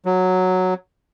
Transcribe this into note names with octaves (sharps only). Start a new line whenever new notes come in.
F#3